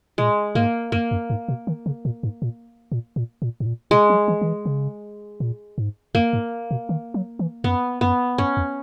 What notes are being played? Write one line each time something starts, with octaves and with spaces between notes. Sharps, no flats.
A#2 G#3
G#2 A#3
F#2 A#3
F#2
G#2
B2
D#3
C#3
A#2
G#2
A#2
A#2
A#2
A#2
G#2
A#2
B2 G#3
F#3
E3
D#3
E3
C#3
A#2
G#2
F#2 A#3
G#2
B2
D#3
F#3
E3
F#2 B3
F#2 B3
F#2 C#4
E2